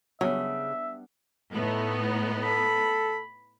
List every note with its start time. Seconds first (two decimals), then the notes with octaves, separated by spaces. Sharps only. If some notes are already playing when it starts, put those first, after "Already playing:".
0.21 C#3 F#3 G3 B3 D4 E5
1.54 A2 A3 B3 D#4
2.43 A4 B5